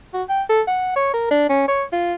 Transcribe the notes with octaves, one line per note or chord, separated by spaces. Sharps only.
F#4
G5
A4
F#5
C#5
A#4
D4
C#4
C#5
F4